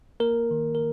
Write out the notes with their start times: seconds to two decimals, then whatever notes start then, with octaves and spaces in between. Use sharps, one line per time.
0.20 A#3 A#4
0.51 D#3
0.75 A#4